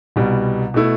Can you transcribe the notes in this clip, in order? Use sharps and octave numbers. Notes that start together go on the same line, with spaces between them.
C2 B2 G3
B2 A3 E4